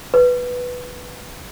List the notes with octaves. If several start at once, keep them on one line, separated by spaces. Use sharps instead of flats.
B4